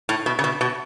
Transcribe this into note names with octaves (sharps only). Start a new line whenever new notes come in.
A2
B2
C#3
B2
B2